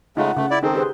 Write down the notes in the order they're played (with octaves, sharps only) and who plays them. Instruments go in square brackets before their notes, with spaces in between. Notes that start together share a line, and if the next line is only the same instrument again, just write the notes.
[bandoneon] C#3 G#3 A3 [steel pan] D#4 F4 [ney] F#5
[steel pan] C#3 [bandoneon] A3
[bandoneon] E4 D5
[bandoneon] D#3 C4 [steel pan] D#4 G#4 A4
[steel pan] G4 B4 C5 [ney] G#4